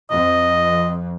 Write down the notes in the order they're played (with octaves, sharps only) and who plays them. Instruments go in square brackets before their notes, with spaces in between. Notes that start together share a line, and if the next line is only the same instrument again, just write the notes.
[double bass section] F2 [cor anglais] D#5